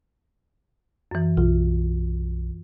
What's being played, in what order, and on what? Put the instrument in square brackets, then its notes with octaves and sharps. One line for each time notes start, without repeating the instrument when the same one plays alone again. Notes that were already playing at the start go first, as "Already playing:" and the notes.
[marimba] F#2 E3
[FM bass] B1 [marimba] F4